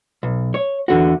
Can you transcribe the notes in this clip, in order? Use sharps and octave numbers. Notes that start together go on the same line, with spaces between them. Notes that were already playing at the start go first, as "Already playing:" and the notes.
B1
C#5
E2 D3 F#4